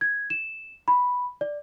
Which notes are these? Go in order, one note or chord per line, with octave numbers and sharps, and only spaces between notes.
G#6
E7
B5
D5